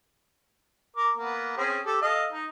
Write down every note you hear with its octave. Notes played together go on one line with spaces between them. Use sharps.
A#4 D6
A#3 B3
C4 C#4 G#4
G4 A4
A4 D#5 F5
D#4